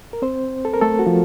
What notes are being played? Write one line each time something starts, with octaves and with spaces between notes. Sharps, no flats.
A#4
C4 C5
A4
A#4
A3 A4
F#4
F3 F4